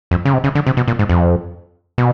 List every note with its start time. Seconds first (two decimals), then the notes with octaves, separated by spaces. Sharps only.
0.11 F2
0.25 C#3
0.33 C3
0.44 C#3
0.55 D3
0.67 C3
0.77 B2
0.88 A#2
0.99 G#2
1.09 F2
1.98 B2